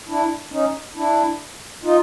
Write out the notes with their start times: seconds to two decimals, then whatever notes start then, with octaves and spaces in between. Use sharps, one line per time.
0.09 D4 E4
0.52 C#4 D#4
0.96 D4 E4
1.83 D#4 F4